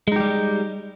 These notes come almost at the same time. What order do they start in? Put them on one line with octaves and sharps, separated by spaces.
G#3 D#4 G4 G3